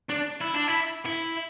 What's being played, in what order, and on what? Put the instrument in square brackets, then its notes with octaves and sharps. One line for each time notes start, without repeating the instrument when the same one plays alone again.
[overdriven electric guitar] D4
E4
D4
E4
E4